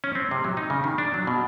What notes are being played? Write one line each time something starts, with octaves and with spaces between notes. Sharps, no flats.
C#4
C4
C3
F#3
D#4
C#3
D#3
D4
F#3
B2